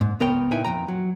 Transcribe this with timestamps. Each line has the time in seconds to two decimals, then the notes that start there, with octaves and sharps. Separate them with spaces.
0.01 G#2
0.20 C#2 B3 A#4 C#5 G5
0.51 A#2 D#4 E4 B4 G5 G#5
0.64 F2 E3 G5 A#5
0.88 F#3